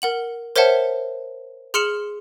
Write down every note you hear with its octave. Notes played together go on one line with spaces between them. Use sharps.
A#4 F#5 F#7
A#4 C5 C#5 E5 F#5 A5
G#4 C6 F6 C#7 E7 F#7